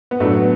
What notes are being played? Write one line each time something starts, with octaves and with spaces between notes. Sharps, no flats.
B3
A2 F#3 A3 D4
B3